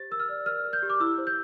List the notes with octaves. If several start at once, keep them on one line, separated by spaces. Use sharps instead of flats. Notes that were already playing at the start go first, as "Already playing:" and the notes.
Already playing: G4 C5 A6
A#4 E6
F6
D5
A#4 F6
A#4
G6
G4
D6
E4 E6
C5
G6